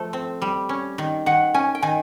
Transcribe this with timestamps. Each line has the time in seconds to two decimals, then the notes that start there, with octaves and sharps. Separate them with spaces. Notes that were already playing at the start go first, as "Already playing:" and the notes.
Already playing: F3 A3
0.13 C4
0.42 G3
0.69 C#4
0.98 D#3
1.26 D#3 F#5
1.54 C#4 G#5
1.75 G5
1.82 D#3 G#5